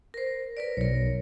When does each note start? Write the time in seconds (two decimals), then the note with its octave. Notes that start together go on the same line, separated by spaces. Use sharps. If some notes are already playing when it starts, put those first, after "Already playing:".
0.14 A#4 C5
0.57 A#4 B4 D5
0.77 B1 A#4 C#5